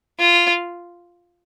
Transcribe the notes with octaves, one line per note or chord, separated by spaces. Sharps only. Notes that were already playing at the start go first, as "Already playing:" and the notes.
F4